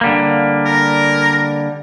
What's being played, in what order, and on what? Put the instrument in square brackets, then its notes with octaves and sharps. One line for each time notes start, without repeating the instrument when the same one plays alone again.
[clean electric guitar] D3 G3 A#3
[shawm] A#4